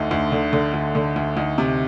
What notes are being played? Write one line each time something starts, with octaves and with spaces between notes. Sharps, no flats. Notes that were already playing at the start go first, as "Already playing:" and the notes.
Already playing: D2 D3 D#4
D2
D3
D3
D2
D3
D2
D2 D#4
C3